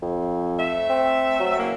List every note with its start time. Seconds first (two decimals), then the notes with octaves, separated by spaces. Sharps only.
0.02 F2
0.59 A3 E5
0.89 C4
1.40 F#3
1.59 C#3 E3 A#3